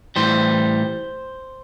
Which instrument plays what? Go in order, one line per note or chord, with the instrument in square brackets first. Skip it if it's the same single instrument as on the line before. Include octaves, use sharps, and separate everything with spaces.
[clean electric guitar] A2 E3 G3 C5